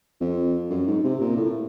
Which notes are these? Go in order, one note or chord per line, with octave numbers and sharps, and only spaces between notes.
F2
F#2
G#2
C3
A#2
A2